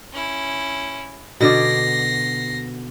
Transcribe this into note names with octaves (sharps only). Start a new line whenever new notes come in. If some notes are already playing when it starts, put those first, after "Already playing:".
C#4 E4
B2 D3 D5 A#6 C7